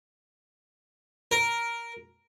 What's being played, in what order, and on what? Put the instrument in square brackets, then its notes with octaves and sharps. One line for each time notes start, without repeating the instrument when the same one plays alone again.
[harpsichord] A#4